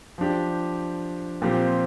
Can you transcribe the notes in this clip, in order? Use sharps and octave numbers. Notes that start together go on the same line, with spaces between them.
F3 D4 G4
A#2 F3 C4 G4